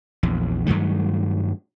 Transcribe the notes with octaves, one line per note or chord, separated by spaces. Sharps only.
A#1 E2
G2 D#3 F#3 A3